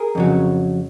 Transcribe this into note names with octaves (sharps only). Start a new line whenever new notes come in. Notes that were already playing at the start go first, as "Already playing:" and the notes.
Already playing: G#4 A#4
F2 C#3 F#3